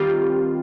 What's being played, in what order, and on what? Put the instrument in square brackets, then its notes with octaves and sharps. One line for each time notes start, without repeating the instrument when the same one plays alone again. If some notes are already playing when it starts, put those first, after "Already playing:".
Already playing: [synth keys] D#3 G3 C4 F4 [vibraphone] G4